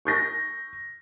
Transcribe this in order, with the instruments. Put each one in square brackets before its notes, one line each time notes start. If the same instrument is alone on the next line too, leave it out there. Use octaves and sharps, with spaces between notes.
[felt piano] C#6 G6 A#6